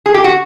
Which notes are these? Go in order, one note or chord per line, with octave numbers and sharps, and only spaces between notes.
G#4
G4
F#4